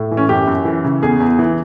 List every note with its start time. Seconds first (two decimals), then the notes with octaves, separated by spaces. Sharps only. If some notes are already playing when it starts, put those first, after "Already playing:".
Already playing: A2
0.11 E3
0.17 C#4
0.29 F#2 G4
0.48 F#2
0.65 E3
0.84 C#3
1.02 E2 G#4
1.20 E2
1.39 E3